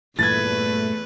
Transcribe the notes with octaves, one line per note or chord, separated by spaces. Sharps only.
E2 G2 A#2 E3 A3 B4 G#6 A6